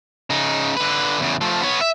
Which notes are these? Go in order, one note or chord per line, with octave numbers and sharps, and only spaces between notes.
C#3 D#4
D3 B4
E2 C#3
F3 A3
B3 C#5
E5